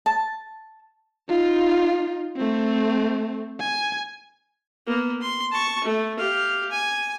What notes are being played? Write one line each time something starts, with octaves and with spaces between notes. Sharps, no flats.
A5
D#4 F4
A3 C4
G#5
A#3 B3
C6
A5 C#6
A3
G4 F5
G#5